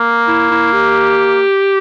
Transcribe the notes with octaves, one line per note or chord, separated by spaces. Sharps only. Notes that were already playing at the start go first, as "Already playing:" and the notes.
Already playing: A#3
E4
E4
G4